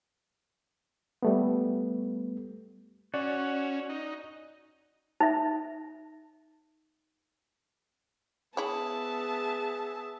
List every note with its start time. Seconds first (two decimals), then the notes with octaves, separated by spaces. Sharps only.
1.23 G3 A3 B3
3.14 C#4 F#4 D5
3.90 D#4
5.20 D#4 E5
8.57 B3 E4 G#4 C#5 E5 A5